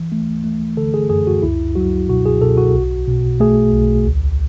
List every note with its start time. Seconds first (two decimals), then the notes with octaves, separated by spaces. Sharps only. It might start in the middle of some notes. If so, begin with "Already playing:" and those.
Already playing: E3
0.12 A3
0.44 A3
0.77 D3 A4
0.94 G#4
1.10 F#2 G#4
1.27 F#4
1.43 C#2 E4
1.75 F#3 F#4
2.09 B2 F#4
2.26 G#4
2.41 B2 A4
2.58 F#4
2.74 B1
3.08 B2
3.40 A3 G#4
3.73 B1
4.06 D2